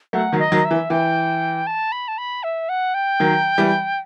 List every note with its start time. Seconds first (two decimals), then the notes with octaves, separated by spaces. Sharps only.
0.13 F#3 A3 F#5
0.33 D#3 F#3
0.39 D#5
0.52 D#3 F#3
0.65 E5
0.71 E3
0.90 E3 G5
1.67 A5
1.92 B5
2.08 A5
2.18 B5
2.43 E5
2.69 F#5
2.94 G5
3.20 D#3 F#3
3.58 E3 G3